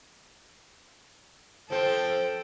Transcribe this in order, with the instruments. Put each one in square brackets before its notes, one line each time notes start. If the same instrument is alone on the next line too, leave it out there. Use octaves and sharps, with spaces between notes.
[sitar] F3 C4 [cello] A4 G5